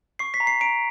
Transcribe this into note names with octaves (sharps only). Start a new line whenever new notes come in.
C#6 C7
B6
A#5
C7
A#5 D7